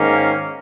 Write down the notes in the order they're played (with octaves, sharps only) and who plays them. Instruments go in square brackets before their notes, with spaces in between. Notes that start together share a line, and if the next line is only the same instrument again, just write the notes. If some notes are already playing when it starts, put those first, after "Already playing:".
Already playing: [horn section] G#2 D#3 A#3 C#4